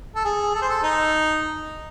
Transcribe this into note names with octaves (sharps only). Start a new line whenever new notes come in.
A4
G#4
A4
C5
A4
D#4